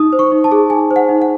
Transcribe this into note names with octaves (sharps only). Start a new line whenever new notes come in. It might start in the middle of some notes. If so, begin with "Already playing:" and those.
Already playing: D#4 D#6
C5
C#6
D#4
A5
G#4
D#4 G#5
C5
F#5
D#4
F#5